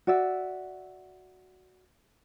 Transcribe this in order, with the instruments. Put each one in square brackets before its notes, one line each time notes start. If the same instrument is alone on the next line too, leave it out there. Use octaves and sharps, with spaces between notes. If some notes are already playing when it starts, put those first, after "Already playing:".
[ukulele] F#4 D5 E5